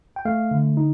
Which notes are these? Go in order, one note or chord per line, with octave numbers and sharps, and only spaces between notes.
G5
A3 F5
D3
D#4